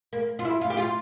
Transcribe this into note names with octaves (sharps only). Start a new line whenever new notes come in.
A#3
F4
E4
F4
G4
F4